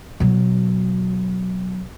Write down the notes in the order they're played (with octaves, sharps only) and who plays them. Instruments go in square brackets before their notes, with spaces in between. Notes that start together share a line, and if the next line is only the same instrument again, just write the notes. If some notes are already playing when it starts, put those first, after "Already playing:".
[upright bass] B2 F#3